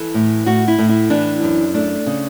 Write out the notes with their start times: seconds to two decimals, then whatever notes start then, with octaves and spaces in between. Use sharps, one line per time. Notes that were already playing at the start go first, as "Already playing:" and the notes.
Already playing: E3 A4
0.14 A2
0.46 A2 F#4
0.68 E4
0.78 A2
0.89 E4
1.10 E3 D4
1.43 F#2
1.74 A3 D4
2.06 C#3